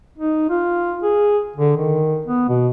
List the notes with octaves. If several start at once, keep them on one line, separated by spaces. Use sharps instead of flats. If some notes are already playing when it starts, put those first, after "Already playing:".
D#4
F4
G#4
D3
D#3
B3
B2